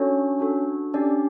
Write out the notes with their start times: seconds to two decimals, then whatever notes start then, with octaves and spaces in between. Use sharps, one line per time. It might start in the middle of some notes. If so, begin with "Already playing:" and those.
Already playing: C#4 D4 F#4 A4 C#5
0.39 D4 F#4 A4
0.94 C#4 D4 G4 D5